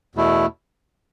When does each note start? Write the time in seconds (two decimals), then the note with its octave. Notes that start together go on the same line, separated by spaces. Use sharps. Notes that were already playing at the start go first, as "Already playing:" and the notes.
0.15 E2 B2 A3 E4